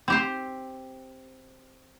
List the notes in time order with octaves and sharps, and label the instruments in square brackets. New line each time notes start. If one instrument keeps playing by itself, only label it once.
[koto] C4 G4 C5